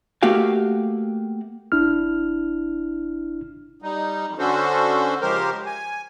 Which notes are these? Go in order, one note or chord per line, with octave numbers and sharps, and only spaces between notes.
A3 A#3 F#4 G4 F5
G1 D4 E4 F6
G3 D#4
F2 G3
D3 C#4 D4 F#4 A4 C5
C#3 F3 G#3 G4 A#4 C5
G#5